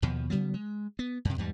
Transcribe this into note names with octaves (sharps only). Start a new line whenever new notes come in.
D#2 B2 F3
C#3 F#3 G3 B3
G#3
B3
F#2 C3
E2 G#2 G3